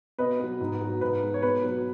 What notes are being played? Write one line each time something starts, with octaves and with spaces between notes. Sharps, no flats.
B2 B4 D#5
F#3 B3
G#2
F#3 B3
G#2 B4
G#3 B3
C#5
B2 B4
F#3 B3